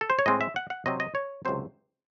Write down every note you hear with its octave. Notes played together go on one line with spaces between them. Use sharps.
A4
C5
C#5
A2 G#3 C4 D#5
E5
F#5
F#5
C3 F#3 C4 D#5
D#5
C#5
C#2 C3 F#3 C4 C5